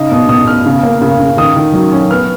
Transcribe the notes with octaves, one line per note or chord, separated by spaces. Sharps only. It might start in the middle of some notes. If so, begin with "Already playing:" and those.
Already playing: C#3 D#4
B2 D#6
B2 D#6
B2 F6
C#3
A#3
C#3
C#3
D#3 D#6
D#3
F#3
C#4
B3 F6